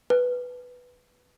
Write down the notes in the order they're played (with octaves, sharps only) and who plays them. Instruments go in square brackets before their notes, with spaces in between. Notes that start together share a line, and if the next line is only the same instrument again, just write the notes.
[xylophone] B4